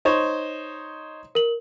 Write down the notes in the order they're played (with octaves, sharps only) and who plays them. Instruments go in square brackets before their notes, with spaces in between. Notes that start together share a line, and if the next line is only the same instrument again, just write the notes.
[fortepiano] D#4 C5 C#5
[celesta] A#4 F#7